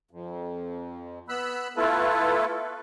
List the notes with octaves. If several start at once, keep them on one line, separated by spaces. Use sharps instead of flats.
F2
B3 B5 E6 F#6
A3 B3 E4 F4 A4 B4